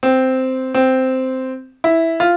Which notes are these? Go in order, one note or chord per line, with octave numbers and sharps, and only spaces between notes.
C4
C4
E4
F4